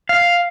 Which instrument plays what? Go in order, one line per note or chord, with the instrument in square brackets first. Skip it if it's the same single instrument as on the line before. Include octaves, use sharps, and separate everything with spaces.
[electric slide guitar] F5